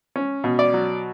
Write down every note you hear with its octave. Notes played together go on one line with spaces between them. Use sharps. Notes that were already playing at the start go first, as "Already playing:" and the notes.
C#4
B2
D5
F#3